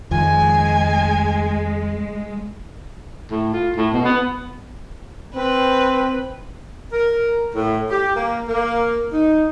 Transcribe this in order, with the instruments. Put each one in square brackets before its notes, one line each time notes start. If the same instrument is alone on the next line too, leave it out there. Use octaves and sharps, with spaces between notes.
[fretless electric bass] F2 D#3 F3 [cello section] G#3 [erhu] G#5
[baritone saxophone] A2
F4
A2
B2
B3
[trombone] C4 [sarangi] B4
[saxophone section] A#4
A2
G4
A#3
A#3
D#4